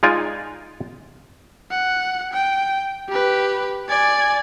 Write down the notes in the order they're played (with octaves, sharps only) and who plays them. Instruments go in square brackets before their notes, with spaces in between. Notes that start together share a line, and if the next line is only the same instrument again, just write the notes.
[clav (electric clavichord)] G#3 D#4 F4 D5 G#5
[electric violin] F#5
G5
G4 B4
D5 G#5